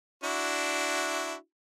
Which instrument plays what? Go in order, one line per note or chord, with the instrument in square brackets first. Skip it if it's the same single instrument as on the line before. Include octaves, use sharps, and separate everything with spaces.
[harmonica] D4 E4 F#4